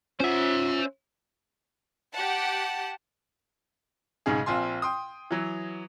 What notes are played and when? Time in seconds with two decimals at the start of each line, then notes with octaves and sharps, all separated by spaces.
0.20 C#4 F4 C5 E5 F#5
2.14 G4 F#5 A5
4.26 B1 G#2 C#3 G#4
4.46 A#1 C4 F4 G#5 C6
4.82 G5 C6 D#6
5.31 E3 F#3